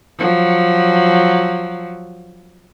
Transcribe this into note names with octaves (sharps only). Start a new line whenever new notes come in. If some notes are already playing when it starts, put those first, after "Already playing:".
F3 F#3